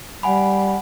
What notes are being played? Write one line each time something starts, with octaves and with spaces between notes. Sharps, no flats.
G3 F#5 G#5 B5